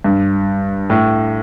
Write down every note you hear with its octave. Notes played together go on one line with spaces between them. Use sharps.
G2
A2